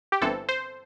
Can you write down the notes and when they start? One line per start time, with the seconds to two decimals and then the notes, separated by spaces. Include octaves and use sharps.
0.12 G4
0.22 G1 G2 E3 C4 A4
0.49 C5